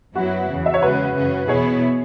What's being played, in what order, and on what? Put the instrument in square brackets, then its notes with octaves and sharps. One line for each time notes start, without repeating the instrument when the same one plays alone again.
[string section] F#2 F#3 B3 E4 [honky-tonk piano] F#4
[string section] E2 C#3 E3
[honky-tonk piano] E5
C#5
[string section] E2 C#3 G#3 C#4 [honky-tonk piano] F#4 B4
[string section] F#2 C#3 E3 C#4
[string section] E2 B2 B3 E4 [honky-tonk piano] G#4 C#5